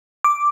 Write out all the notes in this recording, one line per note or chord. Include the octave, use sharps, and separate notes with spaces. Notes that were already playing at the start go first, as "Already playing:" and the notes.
D6